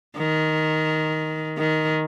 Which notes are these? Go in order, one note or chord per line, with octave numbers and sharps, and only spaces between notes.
D#3
D#3